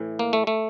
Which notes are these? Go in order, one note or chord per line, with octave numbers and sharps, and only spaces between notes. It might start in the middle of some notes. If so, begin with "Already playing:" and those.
Already playing: A2 E3
A#3
A3
A3